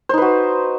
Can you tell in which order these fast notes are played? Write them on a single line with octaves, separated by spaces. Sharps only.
C5 D#4 B4 F#4